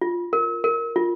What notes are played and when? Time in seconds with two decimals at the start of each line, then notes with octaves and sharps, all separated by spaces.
0.01 F4
0.33 A#4
0.64 A#4
0.96 F4